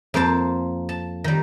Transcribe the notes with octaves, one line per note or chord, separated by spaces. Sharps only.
F2 A#3 C5 A5
A5
D#3 G3